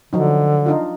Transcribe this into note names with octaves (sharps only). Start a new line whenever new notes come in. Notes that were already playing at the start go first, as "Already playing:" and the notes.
D3 F3 F#3 D#4
D4 D#4 F4